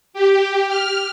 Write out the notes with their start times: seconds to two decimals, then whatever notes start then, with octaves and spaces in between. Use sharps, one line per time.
0.14 G4
0.68 F6